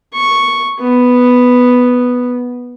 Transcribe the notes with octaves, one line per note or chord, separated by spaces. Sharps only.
C#6
B3